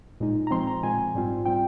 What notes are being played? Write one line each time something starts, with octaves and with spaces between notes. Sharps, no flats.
A#2 G#3 D#4
A#5
A#2 F3 G#3 C4 C6
A#5
A#2 F3 G#3 C4 G#5
G#2 G3 C4 F4
G3 C4 F4 G5